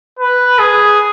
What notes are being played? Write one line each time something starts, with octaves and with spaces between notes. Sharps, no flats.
B4
G#4